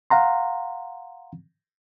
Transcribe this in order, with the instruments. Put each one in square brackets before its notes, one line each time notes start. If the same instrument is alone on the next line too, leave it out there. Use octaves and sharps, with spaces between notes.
[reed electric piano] F5 F#5 A#5 C6